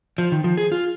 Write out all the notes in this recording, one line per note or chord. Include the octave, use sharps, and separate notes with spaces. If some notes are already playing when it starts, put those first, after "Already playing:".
F3
D#3
F3
G#4
F4